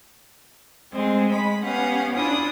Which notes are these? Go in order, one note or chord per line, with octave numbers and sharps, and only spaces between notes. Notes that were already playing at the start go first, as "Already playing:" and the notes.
G#3 A3 C4
G#3 B5
B3 C#4 G4 F5 F#5
C#4 D4 E4 F4 D#6